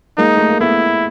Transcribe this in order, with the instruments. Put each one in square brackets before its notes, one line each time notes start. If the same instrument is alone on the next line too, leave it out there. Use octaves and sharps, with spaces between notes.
[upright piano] G#3 A#3 [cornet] D#4
[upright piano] A3
A#3
[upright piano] A3 B3 [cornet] E4